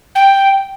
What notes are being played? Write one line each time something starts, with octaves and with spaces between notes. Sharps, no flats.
G5